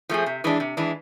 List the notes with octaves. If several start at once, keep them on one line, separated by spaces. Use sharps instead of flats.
F3 A3 C4 G#4
C3
E3 G#3 D4
C3
E3 G#3 D4